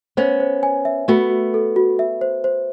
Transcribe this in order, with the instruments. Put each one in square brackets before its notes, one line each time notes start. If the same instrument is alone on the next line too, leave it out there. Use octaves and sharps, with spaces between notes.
[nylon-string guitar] B3 C#4 [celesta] C5
[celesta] C5
G#5
E5
[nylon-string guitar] A3 B3 [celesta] F#4
[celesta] F#4
A4
F#4
E5
C5
C5